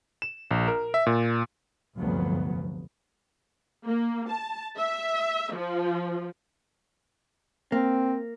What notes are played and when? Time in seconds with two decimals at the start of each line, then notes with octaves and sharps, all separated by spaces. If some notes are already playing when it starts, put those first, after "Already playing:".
0.22 E7
0.51 A#1
0.68 A#4
0.94 E5
1.06 A#2
1.96 F1 D2 G2 F3 F#3 B3
3.85 A#3
4.28 A5
4.78 E5
5.53 F3
7.72 A#3 C4